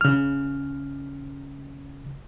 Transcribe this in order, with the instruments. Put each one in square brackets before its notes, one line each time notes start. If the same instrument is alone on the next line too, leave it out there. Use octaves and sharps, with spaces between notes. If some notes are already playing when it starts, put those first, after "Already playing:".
[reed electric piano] C#3 F6